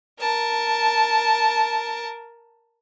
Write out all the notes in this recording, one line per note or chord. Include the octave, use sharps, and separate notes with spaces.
A#4 A5